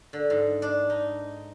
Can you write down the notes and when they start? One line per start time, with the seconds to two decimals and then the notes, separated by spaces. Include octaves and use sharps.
0.13 D3
0.30 G#2
0.62 D4
0.90 D#4